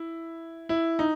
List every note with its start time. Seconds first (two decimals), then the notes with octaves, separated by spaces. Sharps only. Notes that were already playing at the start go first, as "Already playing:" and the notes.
Already playing: E4
0.69 E4
0.99 D#4